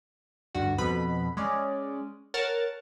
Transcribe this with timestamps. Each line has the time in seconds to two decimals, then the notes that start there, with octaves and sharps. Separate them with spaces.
0.55 D2 G2 F#4
0.78 F2 B2 B4 B5
1.37 G#3 C#4 D5 D#5
2.34 A#4 C#5 F#5 A5 F6 A6